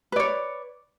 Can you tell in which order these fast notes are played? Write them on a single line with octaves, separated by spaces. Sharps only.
B4 D5 C#5